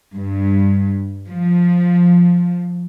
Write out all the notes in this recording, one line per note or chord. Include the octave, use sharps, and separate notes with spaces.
G2
F3